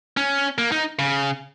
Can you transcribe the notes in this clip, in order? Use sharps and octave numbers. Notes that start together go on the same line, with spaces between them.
C#4
A#3
D#4
C#3